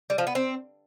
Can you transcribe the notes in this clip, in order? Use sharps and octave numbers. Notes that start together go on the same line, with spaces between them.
G3
F3
B3
C4